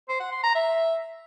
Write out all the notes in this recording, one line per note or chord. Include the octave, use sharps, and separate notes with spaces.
C5
F#5
C6
A#5
E5